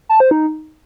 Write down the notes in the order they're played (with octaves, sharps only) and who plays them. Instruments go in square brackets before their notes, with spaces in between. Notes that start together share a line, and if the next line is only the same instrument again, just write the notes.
[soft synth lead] A5
C5
D#4